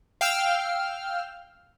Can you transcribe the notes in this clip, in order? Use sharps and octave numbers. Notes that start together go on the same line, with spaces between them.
F5 G5 E6 F6